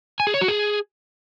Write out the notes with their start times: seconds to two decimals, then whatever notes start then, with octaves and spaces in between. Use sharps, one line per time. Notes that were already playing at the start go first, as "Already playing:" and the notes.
0.20 G#5
0.27 G#4
0.34 C#5
0.41 F#4
0.48 G#4